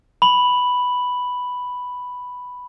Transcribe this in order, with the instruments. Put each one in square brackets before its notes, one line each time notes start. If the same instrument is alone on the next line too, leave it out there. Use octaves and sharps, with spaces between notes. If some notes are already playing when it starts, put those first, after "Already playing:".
[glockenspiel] B5 F#7